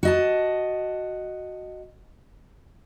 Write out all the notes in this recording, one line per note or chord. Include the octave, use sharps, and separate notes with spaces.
F#4 D#5 A5